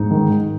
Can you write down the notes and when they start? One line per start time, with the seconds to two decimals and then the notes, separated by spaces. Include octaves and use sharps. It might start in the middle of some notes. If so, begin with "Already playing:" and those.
Already playing: G#2 D#4
0.11 D#3